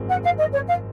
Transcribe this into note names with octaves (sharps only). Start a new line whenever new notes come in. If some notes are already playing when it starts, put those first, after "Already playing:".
Already playing: G#1 F#2 F3 G#3 C4
F#5
F5
D#5
C#5
F5